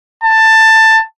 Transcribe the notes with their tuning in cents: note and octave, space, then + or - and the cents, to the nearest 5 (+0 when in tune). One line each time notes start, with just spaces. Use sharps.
A5 +15